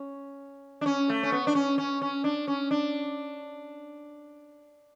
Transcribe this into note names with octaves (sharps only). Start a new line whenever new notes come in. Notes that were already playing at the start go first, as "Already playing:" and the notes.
Already playing: C#4
D4
C#4
A3
C#4
B3
D4
C#4
C#4
C#4
D4
C#4
D4